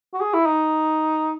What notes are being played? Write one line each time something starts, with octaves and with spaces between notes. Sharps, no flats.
F#4
G#4
E4
D#4